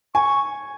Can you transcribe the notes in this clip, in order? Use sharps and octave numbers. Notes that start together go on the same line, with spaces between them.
G#5 C#6